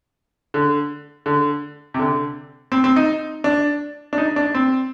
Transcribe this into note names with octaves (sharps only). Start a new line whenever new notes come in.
D3
D3
C3
D3
C4
C4
D#4
D4
D4
D#4
D4
C4